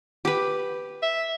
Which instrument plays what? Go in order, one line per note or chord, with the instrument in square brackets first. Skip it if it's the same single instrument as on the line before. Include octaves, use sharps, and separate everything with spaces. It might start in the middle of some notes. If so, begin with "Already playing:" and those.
[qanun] G4 B4
[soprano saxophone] E5